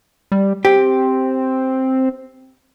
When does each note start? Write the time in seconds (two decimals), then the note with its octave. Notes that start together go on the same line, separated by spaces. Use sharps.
0.32 G3
0.65 C4 G4